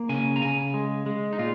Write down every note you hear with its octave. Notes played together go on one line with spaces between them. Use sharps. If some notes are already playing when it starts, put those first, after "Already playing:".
Already playing: A#3
C#3 G#5
A#5
C#3 G#5
G#3
G#3
D#4
A#2 F4